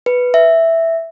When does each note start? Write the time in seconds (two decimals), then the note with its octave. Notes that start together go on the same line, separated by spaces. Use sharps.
0.06 B4
0.34 E5